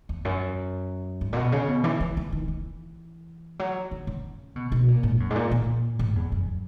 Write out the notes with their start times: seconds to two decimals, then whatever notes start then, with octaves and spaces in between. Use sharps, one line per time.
0.09 E2
0.25 F#2
1.21 G#2
1.33 A#2
1.36 B2
1.52 C#3
1.68 B2
1.84 E3
2.00 E3
2.17 E3
2.32 D#3
2.48 E3
3.59 F#3
3.91 C#3
4.07 C#3
4.56 B2
4.72 B2
4.88 A#2
5.03 G#2
5.20 F#2
5.30 G#2
5.36 A#2
5.51 A#2
5.99 G#2
6.16 E2
6.32 F#2